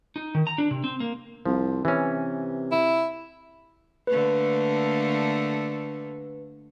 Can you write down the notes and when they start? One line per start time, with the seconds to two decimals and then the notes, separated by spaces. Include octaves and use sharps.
0.16 D#4
0.35 D#3
0.47 A#5
0.58 D4
0.71 C3
0.84 C4
1.00 A#3
1.46 C2 F3
1.85 C3 E3 C#4
2.72 E4
4.07 D3 A3 A#3 B4